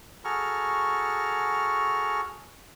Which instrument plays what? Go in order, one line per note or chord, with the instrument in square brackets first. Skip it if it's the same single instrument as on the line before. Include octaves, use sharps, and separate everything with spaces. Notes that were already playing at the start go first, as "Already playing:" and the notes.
[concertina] F#4 G#4 A4 A#5 C#6 F6